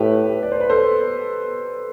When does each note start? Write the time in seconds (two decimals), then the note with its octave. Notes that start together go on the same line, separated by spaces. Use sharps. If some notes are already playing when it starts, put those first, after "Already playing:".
Already playing: A2 G4 B4
0.43 D5
0.52 C5
0.61 B4
0.70 A4 C5